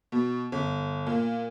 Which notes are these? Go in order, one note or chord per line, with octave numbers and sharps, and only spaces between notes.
B2
G1
A#2